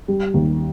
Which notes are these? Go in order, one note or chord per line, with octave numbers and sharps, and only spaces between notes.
G3
D#2